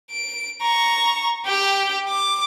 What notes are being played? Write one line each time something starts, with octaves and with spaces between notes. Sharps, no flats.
D7
A#5 C#6
G4 G5
D6